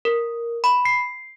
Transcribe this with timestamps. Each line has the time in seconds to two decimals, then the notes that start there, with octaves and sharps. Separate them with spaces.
0.05 A#4
0.64 B5
0.85 C7